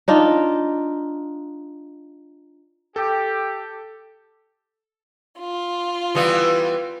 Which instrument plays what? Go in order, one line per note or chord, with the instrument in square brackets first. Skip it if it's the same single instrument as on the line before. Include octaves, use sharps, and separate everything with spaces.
[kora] D4 D#4 F4
[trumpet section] G4 [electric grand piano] A4
[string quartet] F4
[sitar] E3 G3 B3